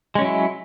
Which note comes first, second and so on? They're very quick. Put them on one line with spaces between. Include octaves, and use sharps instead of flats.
G#3 C#4 F#3 E4